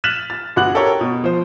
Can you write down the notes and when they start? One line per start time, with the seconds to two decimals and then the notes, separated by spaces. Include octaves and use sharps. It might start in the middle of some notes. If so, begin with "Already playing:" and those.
0.04 F6 F#6 A6 B6 E7 F#7
0.30 A6
0.56 G1 F#4 F#6 F#7
0.74 G4 A4 A#4 C#5
1.01 B2
1.24 F3 C5